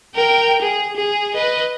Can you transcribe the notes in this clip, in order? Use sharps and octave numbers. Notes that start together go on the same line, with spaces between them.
A#4 G5
G#4
G#4
B4 D#5